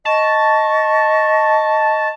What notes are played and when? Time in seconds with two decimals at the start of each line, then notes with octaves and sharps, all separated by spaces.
0.05 D#5 A5 C#6